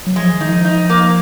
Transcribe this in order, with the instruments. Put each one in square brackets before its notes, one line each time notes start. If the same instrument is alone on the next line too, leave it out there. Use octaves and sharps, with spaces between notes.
[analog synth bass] F#3
[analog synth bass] F3 [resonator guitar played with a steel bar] G#3
[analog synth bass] D#3
[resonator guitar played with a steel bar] D#4
[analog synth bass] F3
[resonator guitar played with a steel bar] D#4
A#3